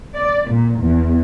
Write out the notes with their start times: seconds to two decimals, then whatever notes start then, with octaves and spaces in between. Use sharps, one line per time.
0.16 D5
0.50 A#2
0.80 E2